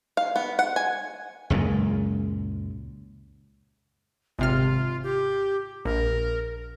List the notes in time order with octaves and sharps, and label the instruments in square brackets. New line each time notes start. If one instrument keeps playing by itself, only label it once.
[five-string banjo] F5
B3
F#5
G#5
[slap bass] C#2 F#2 A#2 G#3
[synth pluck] G#1 C3 F6 [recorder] F4
[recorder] G4
[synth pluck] A#1 [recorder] A#4